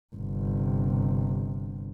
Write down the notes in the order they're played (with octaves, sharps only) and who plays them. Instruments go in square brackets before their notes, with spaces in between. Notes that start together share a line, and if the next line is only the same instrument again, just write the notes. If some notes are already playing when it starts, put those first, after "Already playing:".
[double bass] G1 C3